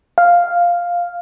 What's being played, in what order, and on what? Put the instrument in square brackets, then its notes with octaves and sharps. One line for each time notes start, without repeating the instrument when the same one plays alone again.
[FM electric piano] F5